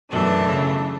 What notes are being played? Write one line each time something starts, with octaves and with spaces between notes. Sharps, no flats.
F#2 B2 E3 A3 D4
C#3